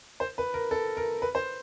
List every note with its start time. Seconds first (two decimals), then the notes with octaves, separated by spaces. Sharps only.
0.20 C5
0.38 B4
0.54 A#4
0.71 A4
0.97 A#4
1.22 B4
1.35 C5